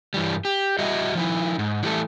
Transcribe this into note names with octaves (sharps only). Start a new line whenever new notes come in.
G2 E3 G3
G4
G3 F#4 D#5 E5
F3 D#4 E4
G#2
E3 G3 A3 A4